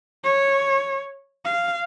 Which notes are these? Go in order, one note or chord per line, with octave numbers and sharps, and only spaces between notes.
C#5
F5